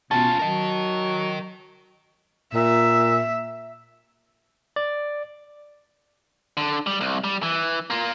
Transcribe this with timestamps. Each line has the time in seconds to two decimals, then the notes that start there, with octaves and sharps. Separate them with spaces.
0.11 B2 C#4 F4 A5
0.39 F#3 A#4 D#5
2.54 A#2 E5
4.76 D5
6.57 D3
6.87 G3
7.01 C2
7.24 G3
7.43 E3
7.90 A#3 F4